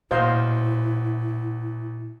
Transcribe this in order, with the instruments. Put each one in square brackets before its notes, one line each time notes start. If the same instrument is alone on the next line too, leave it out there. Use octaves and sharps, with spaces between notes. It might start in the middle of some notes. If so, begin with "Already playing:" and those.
[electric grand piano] A1 F#4 G6 [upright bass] A#2 [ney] E4 [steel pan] C5 D#5 F5